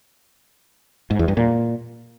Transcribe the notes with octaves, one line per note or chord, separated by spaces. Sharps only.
G#2
E2
G2
A#2